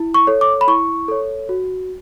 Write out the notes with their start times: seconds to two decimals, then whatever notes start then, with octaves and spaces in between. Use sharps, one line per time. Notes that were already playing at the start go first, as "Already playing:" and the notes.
Already playing: E4
0.14 C#6
0.27 A4 C#5
0.41 D6
0.61 B5
0.68 E4 C#6
1.08 A4 C#5
1.49 F#4